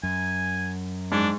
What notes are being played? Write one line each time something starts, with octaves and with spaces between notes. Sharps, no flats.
F#2 G#5
G#2 D4